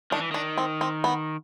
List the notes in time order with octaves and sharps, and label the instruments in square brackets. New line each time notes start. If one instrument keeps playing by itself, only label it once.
[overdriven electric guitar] D#3 [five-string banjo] D4
[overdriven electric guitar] E3
[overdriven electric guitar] D#3 [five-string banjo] D4
[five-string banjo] C4
C4
B3